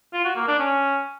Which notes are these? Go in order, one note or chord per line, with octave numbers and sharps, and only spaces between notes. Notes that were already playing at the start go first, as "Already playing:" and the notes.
F4
F#4
A#3
D4
C#4